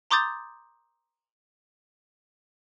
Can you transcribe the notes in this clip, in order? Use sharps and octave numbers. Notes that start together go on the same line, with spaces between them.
A#5 C6 D6 D#6 G6 A6